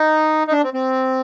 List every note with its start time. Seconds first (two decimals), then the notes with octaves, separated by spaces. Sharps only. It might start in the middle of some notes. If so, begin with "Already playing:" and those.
Already playing: D#4
0.47 D#4
0.52 D4
0.63 C4
0.74 C4